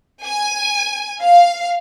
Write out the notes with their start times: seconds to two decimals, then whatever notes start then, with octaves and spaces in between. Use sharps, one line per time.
0.23 G#5
1.20 F5